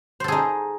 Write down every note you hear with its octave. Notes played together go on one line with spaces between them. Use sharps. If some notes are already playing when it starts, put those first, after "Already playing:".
D#4 G#4 A4 C5